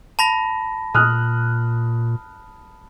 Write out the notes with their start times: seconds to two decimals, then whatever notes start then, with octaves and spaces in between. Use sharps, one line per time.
0.19 A5 B5 A#6
0.94 A#2 D#6 F6 F#6